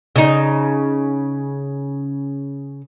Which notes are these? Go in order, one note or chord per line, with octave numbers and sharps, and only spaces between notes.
C#3 D#4